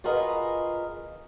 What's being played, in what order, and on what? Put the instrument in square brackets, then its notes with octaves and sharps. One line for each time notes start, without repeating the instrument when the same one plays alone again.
[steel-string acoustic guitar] F4 F#4 G#4 A#4 B4 D#5